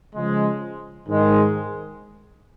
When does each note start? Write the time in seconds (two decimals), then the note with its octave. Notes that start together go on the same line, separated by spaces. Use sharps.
0.15 C#3 F3 G#3
1.08 G#2 D#3 G#3